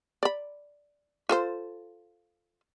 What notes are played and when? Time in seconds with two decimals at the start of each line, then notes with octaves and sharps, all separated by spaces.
0.23 D5 B5
1.29 F4 A4 C5